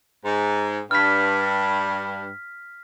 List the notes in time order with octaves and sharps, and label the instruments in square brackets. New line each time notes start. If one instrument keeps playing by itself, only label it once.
[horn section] G#2
[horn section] G2 [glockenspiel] F6 B6